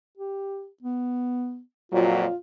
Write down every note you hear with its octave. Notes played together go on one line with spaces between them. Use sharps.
G4
B3
F2 A#2 F#3 F4